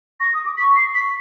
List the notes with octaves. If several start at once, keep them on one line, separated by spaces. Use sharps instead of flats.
C#6 A#6
D#6
D6
C#6 B6
C7
B6